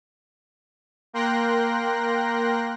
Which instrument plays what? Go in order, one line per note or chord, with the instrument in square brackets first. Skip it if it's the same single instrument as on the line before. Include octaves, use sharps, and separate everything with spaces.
[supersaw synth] A#3 A#4 G5 C6 F#6 A#6